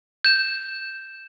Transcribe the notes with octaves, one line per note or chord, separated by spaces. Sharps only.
G6 E7